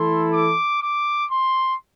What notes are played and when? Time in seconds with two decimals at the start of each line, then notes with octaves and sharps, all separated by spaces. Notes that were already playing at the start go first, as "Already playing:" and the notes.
Already playing: E3 A3 E4 A4 C6
0.33 D6
0.82 D6
1.31 C6